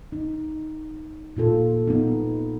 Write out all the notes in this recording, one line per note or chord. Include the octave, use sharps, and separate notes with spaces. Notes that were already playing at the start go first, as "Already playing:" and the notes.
D#4
A#2 F4 A4
B3 D#4